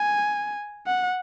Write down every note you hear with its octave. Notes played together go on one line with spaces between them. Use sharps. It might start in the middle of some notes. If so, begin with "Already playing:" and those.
Already playing: G#5
F#5